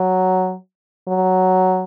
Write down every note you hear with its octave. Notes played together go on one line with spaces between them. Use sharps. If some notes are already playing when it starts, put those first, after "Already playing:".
Already playing: F#3
F#3